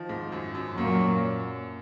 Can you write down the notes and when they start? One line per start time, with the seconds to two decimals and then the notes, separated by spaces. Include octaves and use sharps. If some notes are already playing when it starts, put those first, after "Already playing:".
Already playing: D#3 F3
0.09 G#2
0.32 F#2
0.55 F#2
0.77 F#2 A#2 F#3 A#3